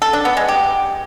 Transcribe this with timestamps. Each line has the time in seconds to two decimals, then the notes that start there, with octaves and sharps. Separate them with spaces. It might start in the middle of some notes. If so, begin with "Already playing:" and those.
0.02 A4
0.13 D4
0.25 B3
0.37 G#3
0.48 G4